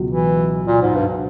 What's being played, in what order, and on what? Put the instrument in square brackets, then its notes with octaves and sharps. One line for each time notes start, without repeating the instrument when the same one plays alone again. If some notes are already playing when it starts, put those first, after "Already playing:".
Already playing: [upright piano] C#2 B2 F#3
[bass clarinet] E3
A#2
G#2
G2